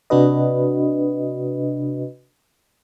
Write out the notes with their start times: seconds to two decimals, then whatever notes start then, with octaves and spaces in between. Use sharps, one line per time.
0.10 C3 D4 F#4 B4 D#5